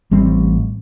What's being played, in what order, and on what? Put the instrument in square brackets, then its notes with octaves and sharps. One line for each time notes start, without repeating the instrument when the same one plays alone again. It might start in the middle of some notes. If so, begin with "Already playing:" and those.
[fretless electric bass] A1 G3 C4